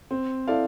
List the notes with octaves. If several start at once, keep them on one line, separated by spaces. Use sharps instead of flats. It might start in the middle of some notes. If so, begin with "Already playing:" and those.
C4
E4 A4 D5 F5